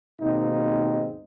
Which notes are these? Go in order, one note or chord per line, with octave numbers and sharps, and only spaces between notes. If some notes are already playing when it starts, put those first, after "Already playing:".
D#2 G#2 B2 A#3 C4 D#4